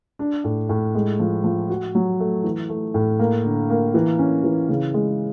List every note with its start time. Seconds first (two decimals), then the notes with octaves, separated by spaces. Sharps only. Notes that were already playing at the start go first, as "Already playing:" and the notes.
0.19 D4
0.44 A2
0.69 A2
0.95 G#3
1.19 F3
1.44 F3
1.70 F#4
1.95 F#3
2.20 A3
2.44 E3
2.69 A3
2.94 A2
3.19 A#3
3.44 D3
3.70 A#3
3.94 E3
4.19 C#4
4.44 E3
4.69 C#3
4.94 G#3